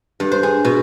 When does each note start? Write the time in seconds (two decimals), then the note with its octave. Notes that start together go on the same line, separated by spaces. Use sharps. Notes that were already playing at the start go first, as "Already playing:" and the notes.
0.20 G2
0.32 C5
0.43 G#4
0.65 B2